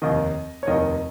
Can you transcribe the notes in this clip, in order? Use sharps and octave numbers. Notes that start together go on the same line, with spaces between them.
F1 D#2 D#3 D#5
C#5
F1 D#2 D#3 D#5